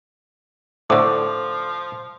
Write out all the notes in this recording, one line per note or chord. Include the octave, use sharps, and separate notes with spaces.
A2 D3 F3 C5 C#6 D6